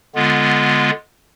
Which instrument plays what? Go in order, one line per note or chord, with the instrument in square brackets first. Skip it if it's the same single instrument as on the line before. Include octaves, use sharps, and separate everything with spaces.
[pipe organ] D3 G#3 B3 F4